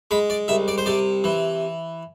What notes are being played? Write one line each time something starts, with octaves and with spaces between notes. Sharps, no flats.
G#3 B5
D5
C2 E5
D5
C5
C3 D5
E3